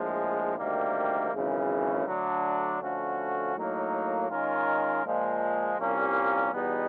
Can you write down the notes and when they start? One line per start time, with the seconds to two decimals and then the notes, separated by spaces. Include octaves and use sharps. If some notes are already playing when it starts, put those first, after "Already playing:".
Already playing: A#1 A2 F3 G#3
0.57 D2 C3 D#3 G3 A#3
1.32 G#1 F#2 C#3 E3
2.06 D3 F#3 A3 D4
2.80 D3 F3 A3 C#4 F#4
3.55 A2 F#3 A#3 D#4
4.29 D#3 G#3 C#4 F4 A#4
5.04 A#2 F3 G#3
5.78 C2 A#2 G3 A#3 C#4
6.52 E2 B2 G3 B3 D#4